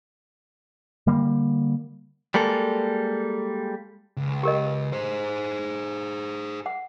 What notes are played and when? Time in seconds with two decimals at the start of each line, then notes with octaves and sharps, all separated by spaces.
1.07 D3 G3 A#3
2.34 G3 G#3 A#3 A4
4.17 C#2
4.43 G4 A#4 D#5
4.93 G#4 C5
6.66 F#5